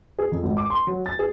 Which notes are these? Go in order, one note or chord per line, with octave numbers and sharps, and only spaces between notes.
G#4
F2
G#1
D6
C6
F#3
A6
G#4